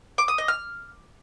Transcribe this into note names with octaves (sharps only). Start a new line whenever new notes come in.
D6
D#6
D#5
F6